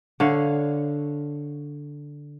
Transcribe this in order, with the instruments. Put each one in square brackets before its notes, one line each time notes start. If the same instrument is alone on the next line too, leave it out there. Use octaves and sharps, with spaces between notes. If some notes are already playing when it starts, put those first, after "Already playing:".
[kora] D3 C#5 F5